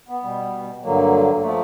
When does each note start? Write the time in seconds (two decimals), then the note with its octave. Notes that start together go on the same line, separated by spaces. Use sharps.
0.09 B3
0.23 B2 G3
0.83 G2 D3 F#3 A#3
1.42 F3 A3